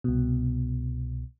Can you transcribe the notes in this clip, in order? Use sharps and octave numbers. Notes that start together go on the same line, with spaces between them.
C2 B2